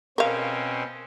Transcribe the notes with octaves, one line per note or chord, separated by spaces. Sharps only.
B2 C4 C#4 A#4 F5